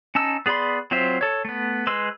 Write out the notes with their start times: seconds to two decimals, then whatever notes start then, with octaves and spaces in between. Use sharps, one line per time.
0.15 C#4 D#4 A5 E6
0.46 B3 G#4 D5 B5 C6
0.91 F#3 C4 F4 C5 E5
1.21 A4 C#5
1.45 A3 B3
1.87 G#3 B4 C6 E6